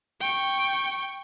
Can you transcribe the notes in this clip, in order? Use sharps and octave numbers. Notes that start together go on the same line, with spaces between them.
G5 C#6